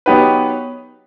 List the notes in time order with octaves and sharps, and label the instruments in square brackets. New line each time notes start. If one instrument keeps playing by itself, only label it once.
[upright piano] F#3 B3 D#4 G4 B4